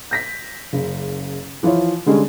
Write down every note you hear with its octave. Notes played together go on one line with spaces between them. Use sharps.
G6 A#6 B6
F#1 C#3
E3 F3 E4 F4 C#5
D3 G3 G#3 C#4